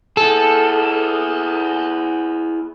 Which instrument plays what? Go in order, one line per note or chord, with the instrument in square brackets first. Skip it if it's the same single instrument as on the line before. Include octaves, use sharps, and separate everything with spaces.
[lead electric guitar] E4 G#4 [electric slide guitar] A4